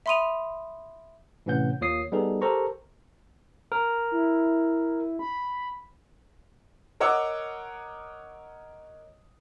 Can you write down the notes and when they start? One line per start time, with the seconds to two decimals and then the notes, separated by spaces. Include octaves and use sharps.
0.06 E5 B5 C6 D#6 D#7 F7
1.46 A2 C3 E3 C#4 F#5 G6
1.81 D#2 A#3 F4 C#5 D#6 C7
2.12 G3 B3 D#4 G#4 A4
2.42 G4 A4 A#4 C5 A#5 C#6
3.72 A#4
4.11 E4
5.19 B5
7.00 A#4 C#5 D#5 F#5 D6 E6